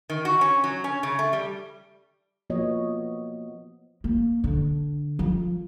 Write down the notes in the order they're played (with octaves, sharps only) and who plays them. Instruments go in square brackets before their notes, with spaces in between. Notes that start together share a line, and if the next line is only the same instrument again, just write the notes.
[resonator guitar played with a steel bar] D#3
F#4
C#4
F#3
C#4
C#3
A3
G3
[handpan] F3 A#3 B3 F#4 C#5 D#5
[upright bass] A#3
D3
F3